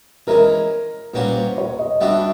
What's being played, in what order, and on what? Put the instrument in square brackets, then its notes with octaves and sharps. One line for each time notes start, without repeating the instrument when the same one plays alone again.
[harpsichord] E3 G#3 C#4 [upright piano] A#4
[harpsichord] A#2 G3 A#3 C#4 F#4 [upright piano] B4
[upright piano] C5
C#5
D#5
[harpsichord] G3 B3 D4 F#4 [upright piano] E5